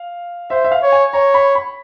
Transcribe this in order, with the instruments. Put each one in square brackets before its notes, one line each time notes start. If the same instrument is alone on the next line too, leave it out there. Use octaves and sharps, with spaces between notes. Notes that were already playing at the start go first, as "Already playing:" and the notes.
Already playing: [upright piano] F5
[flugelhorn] C5 [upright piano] E5
[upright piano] E5
F5
[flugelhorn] C#5
[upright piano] G#5
[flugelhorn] C#5 [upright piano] A#5
[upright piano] B5
B5